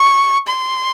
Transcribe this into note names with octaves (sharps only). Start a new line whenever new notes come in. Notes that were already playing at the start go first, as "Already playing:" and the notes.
Already playing: C#6
C6